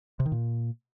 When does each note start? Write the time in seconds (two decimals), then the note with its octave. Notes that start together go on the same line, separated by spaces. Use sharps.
0.20 C3
0.26 D#3
0.32 A#2